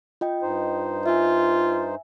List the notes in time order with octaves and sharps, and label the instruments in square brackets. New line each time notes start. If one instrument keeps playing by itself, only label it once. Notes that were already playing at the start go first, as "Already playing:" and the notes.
[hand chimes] F4 D#5 G5
[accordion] G2 D#4 C5
[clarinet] F4 [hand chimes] E5 G#5